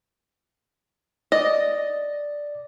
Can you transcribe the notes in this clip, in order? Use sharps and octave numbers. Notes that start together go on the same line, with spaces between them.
D5 D#5